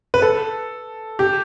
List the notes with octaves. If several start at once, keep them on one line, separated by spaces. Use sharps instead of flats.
B4
A4
G4